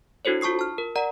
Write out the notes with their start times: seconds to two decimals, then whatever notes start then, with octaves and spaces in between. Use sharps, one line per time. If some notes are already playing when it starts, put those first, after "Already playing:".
0.25 D4 E4 F#4 A4 C5 C#5
0.41 F4 A5 C#6 D#6 C7
0.59 A5 F6
0.78 A#4
0.95 A#4 D5 F#5 A#5